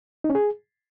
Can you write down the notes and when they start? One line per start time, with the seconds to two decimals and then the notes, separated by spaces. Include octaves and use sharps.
0.24 D#4
0.30 C#4
0.35 G#4